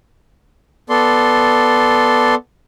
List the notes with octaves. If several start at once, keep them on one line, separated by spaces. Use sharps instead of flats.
B3 A4 D5 C6